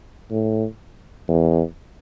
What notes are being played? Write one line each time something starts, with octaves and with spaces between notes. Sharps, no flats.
A2
E2